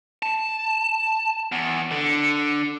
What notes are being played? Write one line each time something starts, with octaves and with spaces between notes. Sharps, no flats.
A5
E2
D3